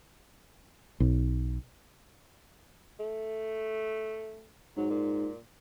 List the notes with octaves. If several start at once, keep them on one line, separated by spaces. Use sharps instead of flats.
B1
A3
G#2 F#3
A#2